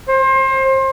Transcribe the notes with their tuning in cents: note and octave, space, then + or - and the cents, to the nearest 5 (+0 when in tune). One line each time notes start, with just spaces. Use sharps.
C5 +30